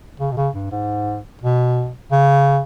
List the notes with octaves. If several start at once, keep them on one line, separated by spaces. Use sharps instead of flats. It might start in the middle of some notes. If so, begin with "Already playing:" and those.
C#3
B2
C#3
G2
G#2
B2
C#3